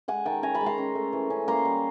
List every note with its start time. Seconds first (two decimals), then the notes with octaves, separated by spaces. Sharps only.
0.08 G#3 F#5 G#5
0.26 D#3 G5 A5
0.43 C#4 G#5 A#5
0.54 A5 B5
0.61 G#3
0.66 A#5 C6
0.78 C#4
0.95 A3
1.13 E3
1.30 C#4
1.48 A#3 A#5 C6
1.65 G3